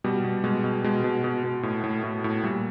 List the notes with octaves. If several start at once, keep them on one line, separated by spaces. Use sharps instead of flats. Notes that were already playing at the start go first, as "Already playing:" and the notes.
B2 G3
B2
B2 G#3
B2
B2 G#3
B2
B2
B2
A2
A2
A2
A2
A#2 G3